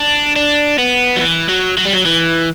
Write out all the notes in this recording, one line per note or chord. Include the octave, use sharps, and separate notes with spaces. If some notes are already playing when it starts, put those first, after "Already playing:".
Already playing: D4
D4
B3
F#3
E3
F#3
F#3
G3
F#3
E3